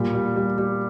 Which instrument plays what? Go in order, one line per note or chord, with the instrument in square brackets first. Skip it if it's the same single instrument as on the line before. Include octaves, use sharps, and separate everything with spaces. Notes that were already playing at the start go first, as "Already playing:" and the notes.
Already playing: [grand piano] A#2 G3
G3
G3
G3